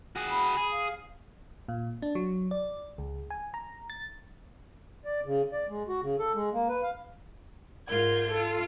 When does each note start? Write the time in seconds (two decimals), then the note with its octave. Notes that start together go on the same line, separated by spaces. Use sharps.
0.16 F#4 G#4
0.30 B5
0.57 G#4
0.71 F5
1.68 A#2
2.02 D4
2.15 F#3
2.51 D5
2.98 C#2
3.30 G#5
3.54 A#5
3.90 A6
5.05 D5
5.26 C#3
5.52 D5
5.69 G#3
5.88 F#4
6.03 C#3
6.19 A4
6.34 G#3
6.54 A#3
6.69 B4
6.83 F5
7.88 G#2 F4 A#4 G6 G#6
8.30 F4 A4